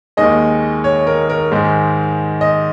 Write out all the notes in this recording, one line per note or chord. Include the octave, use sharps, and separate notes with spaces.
D#2 D#3 G#3 D#5
C#5
A#4
A#4
G#2 D#3 G#3
D#5